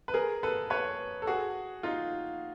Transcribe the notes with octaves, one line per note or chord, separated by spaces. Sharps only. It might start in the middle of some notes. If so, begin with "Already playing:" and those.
B4
G#4 A#4
A4 B4
B4 C#5
A4
F#4 G#4
D#4 F4